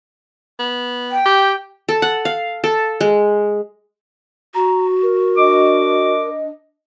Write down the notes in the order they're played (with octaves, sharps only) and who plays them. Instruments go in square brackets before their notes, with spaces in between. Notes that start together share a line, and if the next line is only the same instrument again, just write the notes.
[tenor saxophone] B3
[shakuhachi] G5
[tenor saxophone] G4
[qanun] A4
F#5
F5
A4
G#3
[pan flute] F#4 [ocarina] A#5
[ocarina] A#4
[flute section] D4 D#5 [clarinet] D6